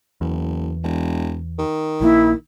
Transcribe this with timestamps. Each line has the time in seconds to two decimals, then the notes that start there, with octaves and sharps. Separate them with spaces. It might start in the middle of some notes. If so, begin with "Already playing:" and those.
0.21 F#1 E2
0.83 E1
1.59 D#3
2.00 A#1 F3 A#3 E4